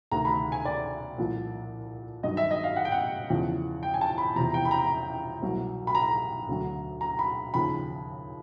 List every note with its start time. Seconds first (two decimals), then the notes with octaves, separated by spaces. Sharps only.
0.12 D2 C3 D#3 A#5
0.25 B5
0.52 G#5
0.65 D5
1.18 C2 A#2 F3
2.23 G2 D#3 F#3 D#5
2.37 E5
2.51 D#5
2.64 F5
2.76 F#5
2.85 G5
2.92 F#5
3.30 E2 C#3 F3
3.83 G5
3.94 G#5
4.01 A5
4.18 B5
4.36 E2 C3 F3 A#5
4.54 G5
4.65 B5
4.71 A#5
5.42 C2 B2 F#3
5.87 B5
5.95 A#5
6.48 D2 D3 F#3
7.01 A#5
7.19 B5
7.54 D#2 C#3 F3 B5